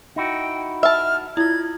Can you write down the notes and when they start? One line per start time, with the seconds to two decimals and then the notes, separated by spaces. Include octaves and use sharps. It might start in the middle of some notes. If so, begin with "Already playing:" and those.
0.16 D#4 E4 F#4 G5
0.83 E5 A5 F6
1.37 E4 F4 G#6